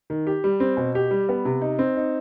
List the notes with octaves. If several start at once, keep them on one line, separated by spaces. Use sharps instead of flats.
D#3
G4
G3
C4
B2
G4
G3
B3
C3
D#4
C4
D#4